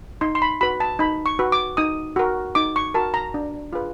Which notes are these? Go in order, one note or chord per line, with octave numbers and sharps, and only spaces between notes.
D#4 C6
C6
B5
F#4 B4 B5
A5
D#4 B5
C#6
F#4 B4
D6
D#4 D#6
F#4 A#4
D#4 D6
C#6
F#4 A#4 A5
A#5
D4
F4 G#4 B4